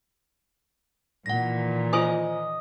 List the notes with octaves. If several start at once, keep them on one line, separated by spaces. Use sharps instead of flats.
A#2 D#3 E3 F#5 A#6
F4 C5 D#5 G#5